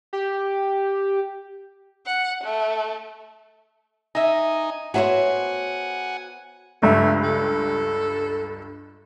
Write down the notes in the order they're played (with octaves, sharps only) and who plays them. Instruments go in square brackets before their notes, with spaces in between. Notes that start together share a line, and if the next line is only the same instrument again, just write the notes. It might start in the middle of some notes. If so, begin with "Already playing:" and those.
[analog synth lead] G4
[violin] F#5
A3
[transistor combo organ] D#4 G#5 [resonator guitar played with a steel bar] D#5 E5
[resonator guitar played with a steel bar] B3 E5 A#5 [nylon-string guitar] F#4 C5 C#5 [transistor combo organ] F#5 G#5
[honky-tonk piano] C#2 G2 [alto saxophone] A3
[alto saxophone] A4